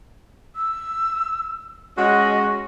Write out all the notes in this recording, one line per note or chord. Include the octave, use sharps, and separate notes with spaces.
E6
G#3 C#4 F#4 D#5